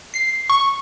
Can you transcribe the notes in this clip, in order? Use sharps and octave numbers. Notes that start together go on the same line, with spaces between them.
C7
C#6